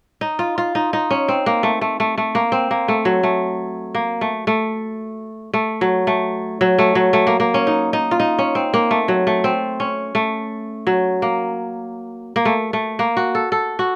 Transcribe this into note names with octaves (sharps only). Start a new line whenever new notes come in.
D#4
F4
F4
D#4
D#4
C#4
C4
A#3
A3
A3
A3
A3
A#3
C4
A#3
A3
F#3
A3
A#3
A3
A3
A3
F#3
A3
F#3
A3
F#3
A3
A#3
A#3
C#4
D#4
D#4
F4
D#4
C#4
C4
A#3
A3
F#3
A3
C4
C#4
A3
F#3
A#3
A#3
A3
A3
A#3
F#4
A4
A4
F#4